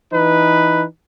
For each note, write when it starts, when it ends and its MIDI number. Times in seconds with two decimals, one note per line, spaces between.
0.12 0.84 52
0.12 0.84 63
0.12 0.84 71